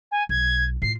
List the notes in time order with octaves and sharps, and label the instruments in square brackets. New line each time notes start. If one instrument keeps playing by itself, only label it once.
[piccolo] G#5
[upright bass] B1 [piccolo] G#6
[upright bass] A2 F4 [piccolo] C7